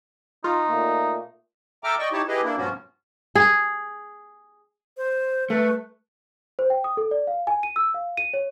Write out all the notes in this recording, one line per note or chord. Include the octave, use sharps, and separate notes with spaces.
D#4 F4
A#2 A3 A#3
A4 E5 G5 A#5 D6 F6
D5 D#5 G5 C#6
D#4 E4 G4 C#5 A5
E4 G4 G#4 B4 D#5
A#3 D4 E4
G2 A#2 F3 B3 C#4 F#4
G#4
C5
A3 B4
C5
G5
D#6
A4
D5
F5
G#5
D#7
E6
F5
D#7
C#5